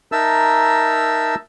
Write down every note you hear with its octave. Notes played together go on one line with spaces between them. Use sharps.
D#4 A#4 E5 A5 E6